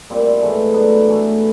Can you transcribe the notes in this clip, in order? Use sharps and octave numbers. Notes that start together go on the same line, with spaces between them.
A#2 G3 C4 E4
G#2 E3 A3
A2 F#3 B3 D4
A2 E3 A3